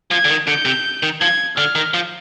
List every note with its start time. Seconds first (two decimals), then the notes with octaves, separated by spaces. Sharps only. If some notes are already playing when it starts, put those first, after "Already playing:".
0.11 F3 G#6
0.25 D3
0.30 D#3
0.47 D3 G6
0.65 C3
1.03 D#3
1.21 F3 G#6
1.57 D3 F6
1.75 D#3
1.94 F3